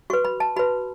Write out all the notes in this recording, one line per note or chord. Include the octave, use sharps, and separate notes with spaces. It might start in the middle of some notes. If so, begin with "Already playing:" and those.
F#4 B4 C#6
B5
A5
F#4 B4 B5